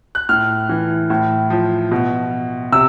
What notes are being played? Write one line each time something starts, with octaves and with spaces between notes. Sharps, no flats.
F#6
A2 F6
E3
A2
F3
B2
C3 E6